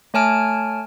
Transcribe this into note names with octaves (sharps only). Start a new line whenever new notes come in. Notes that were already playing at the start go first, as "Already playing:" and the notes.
A3 C#5 G#5 A5 F6 D7